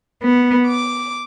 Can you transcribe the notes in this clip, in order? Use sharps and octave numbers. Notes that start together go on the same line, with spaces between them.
B3
D6